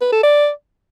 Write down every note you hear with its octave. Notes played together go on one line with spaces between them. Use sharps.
B4
A4
D5